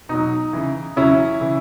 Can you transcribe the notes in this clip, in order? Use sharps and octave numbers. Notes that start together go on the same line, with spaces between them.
B2 F#3 D#4
C#3 E3
C#3 F#3 C#4 E4
C#3 E3